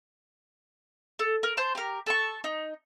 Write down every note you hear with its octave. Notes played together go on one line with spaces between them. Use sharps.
A4
A#4
C5 A5 C6 G6
G4 A#4
A4 A5 C#6
D#4